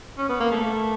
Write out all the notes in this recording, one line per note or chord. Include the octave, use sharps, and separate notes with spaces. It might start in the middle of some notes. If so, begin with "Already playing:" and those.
C#4
B3
A#3
A3